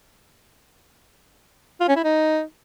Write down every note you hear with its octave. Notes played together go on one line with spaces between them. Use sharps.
F4
C#4
E4
D#4